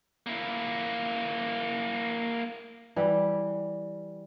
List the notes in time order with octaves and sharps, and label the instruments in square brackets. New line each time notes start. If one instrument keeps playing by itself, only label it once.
[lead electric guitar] A#3 E4
[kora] E3 G3